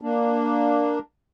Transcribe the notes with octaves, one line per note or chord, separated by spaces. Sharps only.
A#3 D4